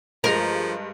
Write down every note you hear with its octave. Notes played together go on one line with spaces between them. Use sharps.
G2 F3 G#3 A#4